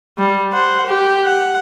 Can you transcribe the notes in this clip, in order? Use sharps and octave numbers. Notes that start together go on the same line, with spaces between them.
G3
C5 F#5
G4
F#5